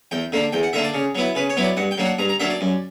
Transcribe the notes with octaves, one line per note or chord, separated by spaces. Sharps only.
E2 G5
D3 A#3 D4
E2 G5
F#5
D3 A#3 D4 E5
D5
C#3
F#3 B3 E4
C#3 B4
C#5
F#3 B3 E4
D5
G2 F#5
G5
F#3 A#3 D4
F#5
G2 A#5
A#5
F#3 A#3 D4 E5
D5
F#2